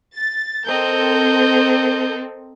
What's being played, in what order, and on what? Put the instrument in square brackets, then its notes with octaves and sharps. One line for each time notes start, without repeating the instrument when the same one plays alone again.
[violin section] A6
[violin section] C4 A4 A#4 [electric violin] D#5 G6